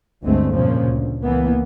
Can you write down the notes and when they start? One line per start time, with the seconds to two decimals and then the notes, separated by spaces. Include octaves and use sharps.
0.23 G1 D2 G#3 A3 C4
0.53 F2 A#2 C#3 F3
0.86 D2
1.23 C#2 E3 A#3 B3